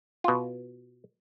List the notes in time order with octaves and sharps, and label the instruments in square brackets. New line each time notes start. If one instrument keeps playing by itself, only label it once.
[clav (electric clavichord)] B2 F4